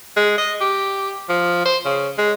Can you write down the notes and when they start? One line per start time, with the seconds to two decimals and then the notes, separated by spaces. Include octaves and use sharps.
0.17 G#3
0.38 D#5
0.61 G4
1.29 F3
1.65 C5
1.85 C#3
2.18 G#3